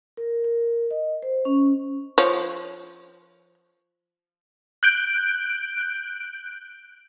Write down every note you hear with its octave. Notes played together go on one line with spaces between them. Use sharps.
A#4
A#4
D#5
C5
C#4
F3 C#5
F#6 G6 D7